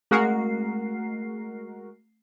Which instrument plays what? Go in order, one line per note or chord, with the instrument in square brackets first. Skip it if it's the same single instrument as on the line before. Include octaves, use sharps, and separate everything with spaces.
[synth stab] G#3 F#4 A#4 [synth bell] A3 C7